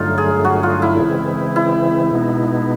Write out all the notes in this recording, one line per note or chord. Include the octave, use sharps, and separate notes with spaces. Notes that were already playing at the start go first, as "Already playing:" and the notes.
Already playing: G2 D3 F#3 A3 D#4 F4
G#4
F#4
F4
E4
C#3 E3 G#3 C4
E4
B2 G#3 B3 D#4